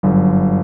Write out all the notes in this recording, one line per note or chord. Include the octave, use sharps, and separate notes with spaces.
G1 F#2 D3